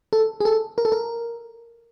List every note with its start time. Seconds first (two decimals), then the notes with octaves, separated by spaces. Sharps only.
0.13 A4
0.40 G#4
0.45 A4
0.78 A#4
0.85 A4
0.92 A#4